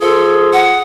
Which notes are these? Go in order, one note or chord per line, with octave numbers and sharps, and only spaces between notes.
F3 F4 G#4 A4
F#5